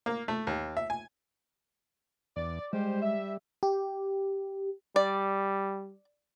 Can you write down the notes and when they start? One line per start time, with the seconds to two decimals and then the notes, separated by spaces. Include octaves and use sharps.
0.06 A#3
0.28 A3
0.47 D#2
0.77 E5
0.90 G#5
2.36 E2 D5
2.73 G3 G#3 G4 C5
3.02 E5
3.63 G4
4.96 G3 D5